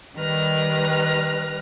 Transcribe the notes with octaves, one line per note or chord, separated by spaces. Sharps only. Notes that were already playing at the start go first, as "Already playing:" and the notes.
D#3 G3 B4 F6 A#6